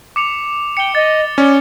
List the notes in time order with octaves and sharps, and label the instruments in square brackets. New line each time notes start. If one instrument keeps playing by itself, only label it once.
[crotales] D6 C#7 F7
[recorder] G5 [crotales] C#7 G7
[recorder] D#5 [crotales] A6
[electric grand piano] C#4 [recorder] D5